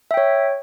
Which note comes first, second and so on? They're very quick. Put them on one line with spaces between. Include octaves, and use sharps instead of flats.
E5 G5 C#5